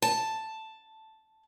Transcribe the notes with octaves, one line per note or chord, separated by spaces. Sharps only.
A5